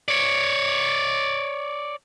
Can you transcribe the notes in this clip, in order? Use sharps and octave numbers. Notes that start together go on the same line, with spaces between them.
C#5 D5